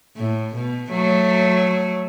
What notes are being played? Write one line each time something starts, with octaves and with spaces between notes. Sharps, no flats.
A2
B2
F#3 A3